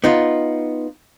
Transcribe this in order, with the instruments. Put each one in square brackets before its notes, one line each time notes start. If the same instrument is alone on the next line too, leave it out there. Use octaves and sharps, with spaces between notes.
[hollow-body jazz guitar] B3 D#4 F4